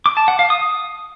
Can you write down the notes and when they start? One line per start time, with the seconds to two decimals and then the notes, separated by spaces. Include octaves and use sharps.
0.06 D6
0.17 A5
0.28 F#5
0.39 F5
0.50 D#6